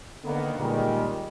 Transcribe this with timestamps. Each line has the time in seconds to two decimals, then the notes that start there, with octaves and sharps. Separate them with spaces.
0.24 D3 D#3 A#3 B3
0.58 A#2 D#3 G3 G#3